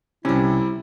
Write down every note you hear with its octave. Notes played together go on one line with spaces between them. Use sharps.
C2 C3 G3 C#4 E4